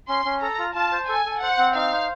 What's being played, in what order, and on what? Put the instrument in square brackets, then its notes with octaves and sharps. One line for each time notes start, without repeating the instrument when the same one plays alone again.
[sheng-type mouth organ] C#4 [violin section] C6
[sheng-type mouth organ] C#4
[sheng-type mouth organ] A4 [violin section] A#5
[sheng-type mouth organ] F4
[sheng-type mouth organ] F4 [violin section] A5
[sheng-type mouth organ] C5
[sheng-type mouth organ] A4 [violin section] G#5
[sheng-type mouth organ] A4
[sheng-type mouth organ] C5 [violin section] F#5
[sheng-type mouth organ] C4
[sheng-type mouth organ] D#4 [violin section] F5
[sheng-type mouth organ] C5